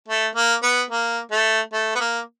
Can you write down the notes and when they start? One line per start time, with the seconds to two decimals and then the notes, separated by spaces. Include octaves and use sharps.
0.08 A3
0.35 A#3
0.63 B3
0.90 A#3
1.32 A3
1.73 A3
1.95 B3
2.00 A#3